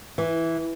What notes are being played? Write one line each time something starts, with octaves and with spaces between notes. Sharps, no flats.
E3